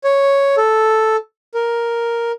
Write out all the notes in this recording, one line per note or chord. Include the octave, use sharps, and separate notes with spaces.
C#5
A4
A#4